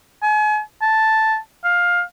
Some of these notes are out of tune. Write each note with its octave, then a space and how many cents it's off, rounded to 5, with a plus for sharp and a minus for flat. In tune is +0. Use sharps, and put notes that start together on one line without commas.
G#5 +40
A5 +0
F5 +15